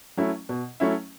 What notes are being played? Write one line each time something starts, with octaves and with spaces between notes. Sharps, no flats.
F#3 A3 C#4 E4
B2
F#3 A3 C#4 E4